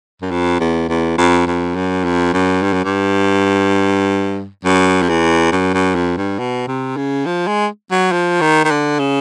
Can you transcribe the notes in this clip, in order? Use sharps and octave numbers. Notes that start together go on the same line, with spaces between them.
F#2
F2
E2
E2
F2
F2
F#2
F2
F#2
G2
F#2
G2
F#2
F2
E2
F#2
F#2
F2
G2
B2
C3
C#3
F3
G#3
F#3
F3
D#3
D#3
D3
C#3